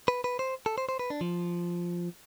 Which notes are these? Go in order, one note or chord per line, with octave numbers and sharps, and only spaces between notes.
B4
B4
C5
A4
C5
C5
B4
D4
F3